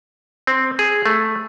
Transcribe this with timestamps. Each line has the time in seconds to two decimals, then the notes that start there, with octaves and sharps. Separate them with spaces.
0.47 C4
0.79 G#4
1.06 A3